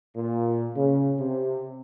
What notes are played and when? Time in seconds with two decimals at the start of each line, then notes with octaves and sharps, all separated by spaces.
0.16 A#2
0.76 C#3
1.19 C3